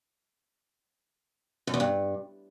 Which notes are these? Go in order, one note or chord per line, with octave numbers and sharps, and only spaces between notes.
F#2
E2
G2